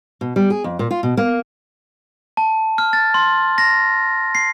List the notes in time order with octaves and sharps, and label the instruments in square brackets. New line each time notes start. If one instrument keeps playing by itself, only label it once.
[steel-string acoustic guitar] B2
G3
G#4
F2
A#2
F4
B2
A#3
[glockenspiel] A5
F6
A6
C6
A#6
C7